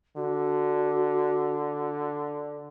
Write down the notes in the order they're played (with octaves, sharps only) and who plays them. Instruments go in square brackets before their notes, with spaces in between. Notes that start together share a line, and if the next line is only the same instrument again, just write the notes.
[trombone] D3 [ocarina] F#4